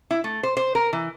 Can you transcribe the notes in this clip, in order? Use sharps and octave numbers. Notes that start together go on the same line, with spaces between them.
E4
A3
C5
C5
A#4
E3